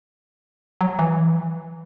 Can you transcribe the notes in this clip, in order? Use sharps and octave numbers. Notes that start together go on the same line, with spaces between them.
F#3
E3